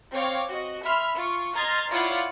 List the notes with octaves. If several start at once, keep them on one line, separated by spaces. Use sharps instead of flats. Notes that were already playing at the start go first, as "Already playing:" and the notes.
C4 C#5 F5 D6
F#4 D#5
E5 B5 C6 F6
F4 C#6
D#5 A#5 C6 F6 G#6 A6
E4 F4 C#5 D5 F5 F#5